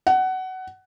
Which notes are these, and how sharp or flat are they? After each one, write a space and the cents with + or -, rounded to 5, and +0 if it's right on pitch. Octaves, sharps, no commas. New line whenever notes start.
F#5 +20